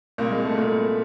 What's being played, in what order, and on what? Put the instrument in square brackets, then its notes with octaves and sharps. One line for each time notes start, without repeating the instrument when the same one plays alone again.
[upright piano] C2 A#2 A#3
G#3
A3
C2 A#2 A3